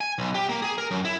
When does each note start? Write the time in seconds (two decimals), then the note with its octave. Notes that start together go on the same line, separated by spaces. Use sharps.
0.01 G#5
0.18 B1
0.34 G4
0.49 A#3
0.62 G#4
0.78 A#4
0.91 F#2
1.05 E4